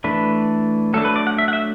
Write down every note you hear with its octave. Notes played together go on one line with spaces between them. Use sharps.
E3 A3 D4 B4
F#3 A3 D4 A4
B4
D5
F#5
E5
F#5
E5